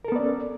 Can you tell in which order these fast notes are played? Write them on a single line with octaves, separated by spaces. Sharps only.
A#4 A4 B3 D5 C#4